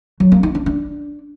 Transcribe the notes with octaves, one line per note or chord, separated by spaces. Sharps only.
F#3
A#3
D#4
D4
D4